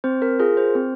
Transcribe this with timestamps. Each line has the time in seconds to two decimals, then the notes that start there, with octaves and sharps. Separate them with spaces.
0.04 C4 C5
0.22 A#4
0.39 F4 G#4 A#4
0.57 C5
0.75 C4